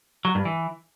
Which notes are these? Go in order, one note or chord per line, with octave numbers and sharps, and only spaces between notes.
F#3
G2
E3